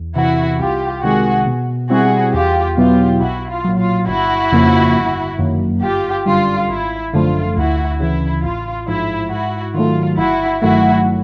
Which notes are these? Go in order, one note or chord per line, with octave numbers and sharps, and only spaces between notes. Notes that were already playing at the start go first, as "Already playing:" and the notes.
Already playing: E2
C3 E3 E4 F#4
C2 F4 G4
C3 D#3 G#3 F#4 G#4
B2
G3 C4 E4 F#4 G#4
E2 F4 G4
B2 F#3 B3 E4 F4 G4
B1 E4 F#4
F4
A#2 F#3
F4
G1 E4 F#4
F2 C#3 F3 A#3
G1
F#2 D#3 F#3 A#3
G1 F4 G4
F#2 D3 G3 F4
G#1 E4
F#2 D3 F3 A3 F4
D2 E4 F#4
C#3 E3 E4
A1 F4
G#2 F3 E4
G#2 E4 F#4
D#3 F#3 A3 F4
G1 E4 F#4
G2 D#3 F#3 A3 E4 F#4